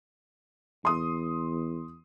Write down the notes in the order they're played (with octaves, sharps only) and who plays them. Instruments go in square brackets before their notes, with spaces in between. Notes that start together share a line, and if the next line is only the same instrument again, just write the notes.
[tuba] E2 [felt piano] C6 D#6